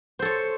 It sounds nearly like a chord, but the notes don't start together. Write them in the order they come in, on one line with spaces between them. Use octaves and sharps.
C5 A4 C#5